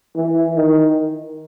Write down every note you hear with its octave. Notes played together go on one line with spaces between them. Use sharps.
E3
D#3